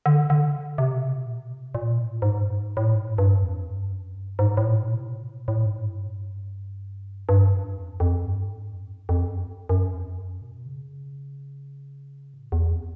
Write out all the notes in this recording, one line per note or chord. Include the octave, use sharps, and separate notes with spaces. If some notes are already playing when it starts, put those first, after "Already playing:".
D3
D3
C3
B2
A#2
B2
C3
A#2
A2
G#2
G2
G#2
A2
G#2
G2
F2
G2
F#2
G2
G#2
A2
A#2
C3
B2
A#2
A2
G#2
G2
G2
F#2
F2
F2
G2
G#2
F#2
F2
F#2
F#2
F2
F#2
B2
C#3
A2
E2
F2